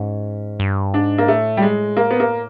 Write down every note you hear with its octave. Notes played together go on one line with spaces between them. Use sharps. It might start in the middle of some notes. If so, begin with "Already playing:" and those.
Already playing: G#2 C#4
G2
G#2 D4
A#3
A2 A3
G3
G#3
A#3
B3
A#3